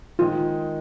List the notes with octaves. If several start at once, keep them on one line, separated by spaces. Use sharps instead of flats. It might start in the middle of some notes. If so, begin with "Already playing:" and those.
D#3 G#3 D#4 F4